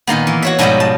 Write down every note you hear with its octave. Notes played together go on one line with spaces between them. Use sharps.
A#2 D#3 A#3 B3
E3
F#4 C#5 E5
G#2 B2 F3 G3 G#3 F#4
A5